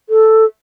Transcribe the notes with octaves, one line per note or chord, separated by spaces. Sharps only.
A4